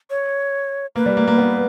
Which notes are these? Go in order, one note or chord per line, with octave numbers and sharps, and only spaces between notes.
C#5
A#3 B4
G3
A#3
A#3
B3